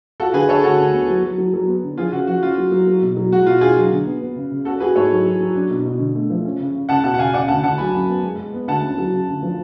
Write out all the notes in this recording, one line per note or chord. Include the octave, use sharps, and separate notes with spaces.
F4 F#4 A4
D3 G#4 B4
D3 A4 C#5
D2 F#4 A4
D2
B3
F#3
F#3
F#3
F#3
B3
D3
F3 F4 G#4
C#3 F#4
F3 F#4
C#4 F4
F#3
F#3
F#3
B2
F#3
G#3 F#4
B2 F4
D4 F4 G#4
F#3
D3
B3
B3
C#3
C#3
C#4 F#4 A4
F#4 G#4 B4
G#2 A4 C#5
F#3
F#3
F#3
D4
B2
B2
D3
A3
F3
C#4
C#3
C#3
C#2 F#5 A5
B2 F#5 A5
F#5
C#2 F5 G#5
C#3 D5 F#5
D2 F#5 A5
D2 F#5 A5
F#3 G#5 B5
F#2
B3
G#3
G#3
B3
D2 F#5 A5
C#4
F#3
C#3
D2
F3